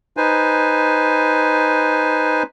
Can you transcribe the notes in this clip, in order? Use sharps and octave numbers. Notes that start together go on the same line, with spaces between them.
D#4 B4 C5 G#5